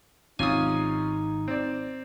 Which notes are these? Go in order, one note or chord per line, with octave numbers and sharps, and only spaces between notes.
G#1 C3 C#4 D#4 F4 G#5 D#6
C4 D5